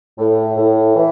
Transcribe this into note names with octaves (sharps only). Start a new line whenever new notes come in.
A2
A2
E3